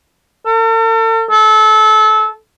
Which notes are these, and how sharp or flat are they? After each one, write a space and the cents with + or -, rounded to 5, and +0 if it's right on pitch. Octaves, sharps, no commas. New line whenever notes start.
A4 +45
A4 -25